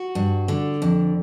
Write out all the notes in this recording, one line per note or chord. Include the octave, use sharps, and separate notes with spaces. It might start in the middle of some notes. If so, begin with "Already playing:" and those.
Already playing: F#4
G2
D3
F2